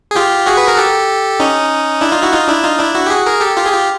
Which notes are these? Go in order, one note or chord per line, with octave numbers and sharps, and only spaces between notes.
G#4
F4 G4
F#4 G#4
B4
A#4
G4 A4
C#4 D#4
D4 E4
D#4 F4
E4 F#4
D#4 F4
D4 E4
D#4 F4
D4 E4
E4 F#4
G4
F#4 G#4
G#4 A#4
G4 A4
F4 G4
G#4
F4 G4